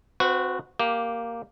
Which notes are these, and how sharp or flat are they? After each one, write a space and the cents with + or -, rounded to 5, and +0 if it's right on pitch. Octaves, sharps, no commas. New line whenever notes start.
C4 +0 F#4 -15 B4 +35
A#3 +0 G4 +0